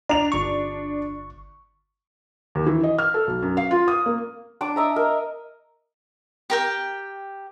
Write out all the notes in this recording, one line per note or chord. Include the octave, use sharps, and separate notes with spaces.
D4 A#5 F7
G1 C#6
D#2
E3
D#5
F6
A4
B1
F#2
F5
F4
D#6
A#3
D4 A5 D6
D#5 E5 A#5
A#4
G4 A#4 G5